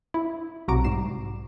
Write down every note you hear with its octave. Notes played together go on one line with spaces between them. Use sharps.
E4
B1 C3 F#4 A#5 D6 D7
G#2 G3 C7 E7